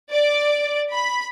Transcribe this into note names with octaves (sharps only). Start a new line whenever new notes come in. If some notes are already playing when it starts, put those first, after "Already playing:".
D5
B5